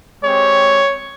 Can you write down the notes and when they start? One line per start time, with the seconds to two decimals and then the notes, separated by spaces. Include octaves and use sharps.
0.22 G#3 C4 G4 C#5